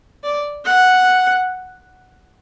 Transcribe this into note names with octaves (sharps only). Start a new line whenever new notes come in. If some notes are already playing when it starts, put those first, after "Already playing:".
D5
F#5